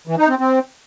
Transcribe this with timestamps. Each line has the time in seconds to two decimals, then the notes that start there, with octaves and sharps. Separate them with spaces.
0.07 E3
0.18 D#4
0.28 C4
0.39 C4